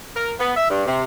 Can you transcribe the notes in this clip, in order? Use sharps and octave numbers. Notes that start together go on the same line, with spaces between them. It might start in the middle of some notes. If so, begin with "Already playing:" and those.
A#4
B3
E5
G2
C3